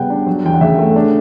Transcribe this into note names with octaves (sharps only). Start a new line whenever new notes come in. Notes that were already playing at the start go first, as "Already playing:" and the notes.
Already playing: C#3 G3 B3 F#5 G5
D4
F#3
E2 G5
F#5
C#3 E5
A3
D4